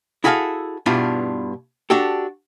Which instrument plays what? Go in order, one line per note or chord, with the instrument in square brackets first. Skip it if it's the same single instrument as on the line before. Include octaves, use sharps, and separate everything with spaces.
[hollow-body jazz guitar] E4 F#4 G#4 A4 E5 F5
G2 B2 D4 E4 F4
D4 F#4 G4 A4